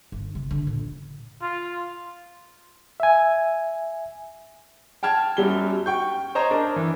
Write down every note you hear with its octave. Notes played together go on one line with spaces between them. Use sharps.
G1
C3
D3
A#2
F4
E5 G#5
G5 A5 F6 G#6
F#2 F#3 G3 G7
G5 C#6 G6
C5 C#5 D#5 A#5
D4 A#4
E3